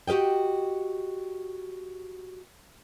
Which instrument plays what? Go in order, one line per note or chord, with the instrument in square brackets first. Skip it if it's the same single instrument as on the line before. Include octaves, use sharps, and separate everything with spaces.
[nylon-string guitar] F#4 G4 B4 D#5 G5